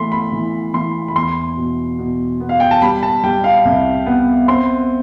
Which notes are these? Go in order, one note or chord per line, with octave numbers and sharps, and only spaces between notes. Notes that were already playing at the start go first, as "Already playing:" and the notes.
Already playing: E3 A3 B5 C6
B5
E3
E3 C6
B5
E2 C6
B2
B2
B3
F5
G5
A5
G3 B5
A5
G3 G5
F5
C2
B3
C4 C6